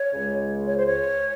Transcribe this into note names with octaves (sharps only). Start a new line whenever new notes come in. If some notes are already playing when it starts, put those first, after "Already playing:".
Already playing: C#5
C#2 C#3 G#3
C#5
C5
C#5